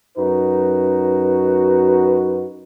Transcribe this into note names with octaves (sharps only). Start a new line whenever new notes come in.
F#2 D#4 F#4 B4